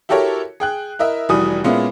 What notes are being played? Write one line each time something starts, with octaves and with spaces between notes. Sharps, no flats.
E4 F#4 G4 A4 A#4 C#5
G#4 G5 F#6
E4 A#4 D#5 E5
F1 E3 G3 F#4 G#5 D#6
A#2 G#3 B3 C#4 E4 F4